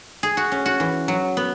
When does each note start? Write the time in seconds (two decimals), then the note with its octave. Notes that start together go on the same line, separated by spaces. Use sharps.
0.23 G#4
0.37 F#4
0.52 C#4
0.66 F#4
0.80 E3
1.08 F#3
1.37 B3